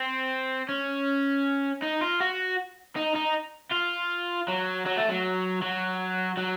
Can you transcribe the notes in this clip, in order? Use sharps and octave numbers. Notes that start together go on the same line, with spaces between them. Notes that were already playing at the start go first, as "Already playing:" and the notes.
Already playing: C4
C#4
D#4
F4
F#4
D#4
D#4
F4
F#3
F#3
A3
F#3
F#3
F#3